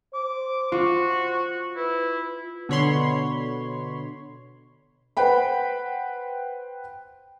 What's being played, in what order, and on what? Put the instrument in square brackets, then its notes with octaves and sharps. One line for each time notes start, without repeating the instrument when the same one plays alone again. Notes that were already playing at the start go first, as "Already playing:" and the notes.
[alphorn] C5 [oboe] D6
[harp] F4 [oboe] F#4
[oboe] E4 [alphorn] B4
[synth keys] B2 D3 C#5 B5 C6
[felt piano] B4 C5 F#5 G5 B5